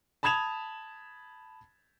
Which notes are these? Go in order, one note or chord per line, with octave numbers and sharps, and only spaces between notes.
A5 B5 D#6 G#6 E7 F7